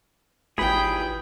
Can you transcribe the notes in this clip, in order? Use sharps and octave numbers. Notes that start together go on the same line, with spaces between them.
G#1 D#2 A#2 E3 G#4 G5 B5